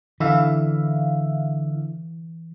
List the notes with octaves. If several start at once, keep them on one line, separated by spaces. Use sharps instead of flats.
D3 E3 E4 E5 F5